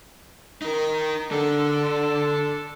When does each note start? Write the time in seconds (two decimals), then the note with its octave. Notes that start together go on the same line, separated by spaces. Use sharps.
0.62 D#4 A#4
1.31 D3 D4 A4